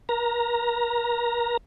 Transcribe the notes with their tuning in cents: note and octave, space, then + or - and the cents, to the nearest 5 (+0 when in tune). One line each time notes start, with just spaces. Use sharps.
A#4 +40 A#5 +0